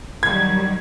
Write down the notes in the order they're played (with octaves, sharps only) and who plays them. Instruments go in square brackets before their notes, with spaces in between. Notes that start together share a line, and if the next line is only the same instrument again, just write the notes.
[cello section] D#3 F#3 G3 [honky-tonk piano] G#6